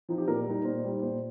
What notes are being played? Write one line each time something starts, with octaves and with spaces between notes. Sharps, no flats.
F3 C4 D#4
G4
A#2 A#4
G3 D#4
A#2 C5
G3 D#4
A#2 C5